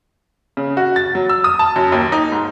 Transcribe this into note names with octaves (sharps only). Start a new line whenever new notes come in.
C#3
F#4
A6
F#3
E6
D#6
A5
F#2
D#2
D#4
G#2